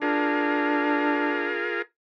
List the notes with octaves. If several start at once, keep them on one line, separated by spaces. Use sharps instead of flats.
D4 F4 G#4 A#4